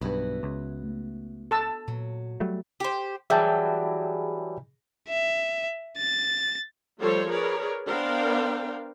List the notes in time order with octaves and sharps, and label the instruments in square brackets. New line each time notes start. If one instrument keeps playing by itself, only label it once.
[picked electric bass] B1 G2 [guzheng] B3 E4 F#4
[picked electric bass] C#2
[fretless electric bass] A3
[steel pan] A4 A5 E6
[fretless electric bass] A#2 [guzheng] F#3
[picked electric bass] F#3 G3 A3
[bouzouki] G4 C5
[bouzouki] E3 F#3 G3 [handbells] G#4 [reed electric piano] E5 G5 A5
[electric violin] E5
A6
[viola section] F3 G3 A3 A4 C5 C#5
G#4 A#4 B4 C#5 D5
B3 D4 A#4 C5 F5 G5